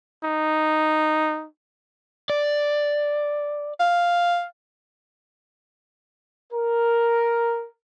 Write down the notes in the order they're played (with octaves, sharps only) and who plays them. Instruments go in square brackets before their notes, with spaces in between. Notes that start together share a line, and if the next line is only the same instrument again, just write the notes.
[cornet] D#4
[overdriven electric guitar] D5
[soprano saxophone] F5
[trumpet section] A#4